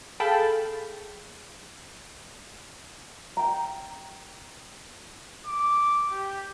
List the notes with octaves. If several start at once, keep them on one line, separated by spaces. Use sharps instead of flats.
G#4 A4 F5 G5 A5 B5
G5 A#5
D6
G4